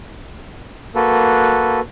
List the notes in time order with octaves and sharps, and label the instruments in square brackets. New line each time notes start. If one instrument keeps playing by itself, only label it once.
[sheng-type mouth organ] A#3 F#4 A4 B4